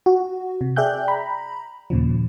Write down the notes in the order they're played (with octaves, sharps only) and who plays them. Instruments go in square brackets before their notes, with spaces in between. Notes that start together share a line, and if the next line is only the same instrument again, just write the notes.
[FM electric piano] F#4
C3
G#4 D5 E5 G5 F#6 G6
A#5 B5
D#2 A#2 C#3 F3